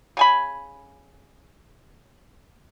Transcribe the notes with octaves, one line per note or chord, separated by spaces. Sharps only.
C#3 G#5 B5